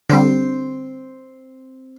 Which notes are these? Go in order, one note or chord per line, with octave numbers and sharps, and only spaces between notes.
D3 G3 C4 C5 G5